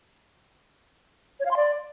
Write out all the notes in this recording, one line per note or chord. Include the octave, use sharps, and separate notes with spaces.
C#5
F5
C6
D5